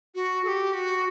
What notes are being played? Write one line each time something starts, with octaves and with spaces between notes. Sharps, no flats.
F#4
A4
G4
F#4